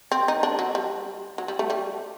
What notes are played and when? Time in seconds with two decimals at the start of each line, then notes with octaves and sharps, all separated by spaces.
0.12 C4
0.28 D#4
0.43 D4
0.59 F#3
0.75 G3
1.38 F#3
1.48 G3
1.59 A3
1.70 G3